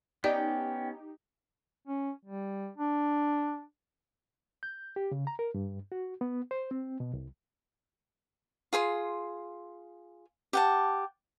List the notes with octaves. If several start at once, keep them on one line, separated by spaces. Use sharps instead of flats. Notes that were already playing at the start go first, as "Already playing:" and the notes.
B3 C#4 D#4 G4 D5 G5
C#4
G3
D4
G6
G4
C#3
A#5
A#4
G2
F#4
B3
C5
C4
B2
C2
F4 G#4 C6
G4 F#5 A5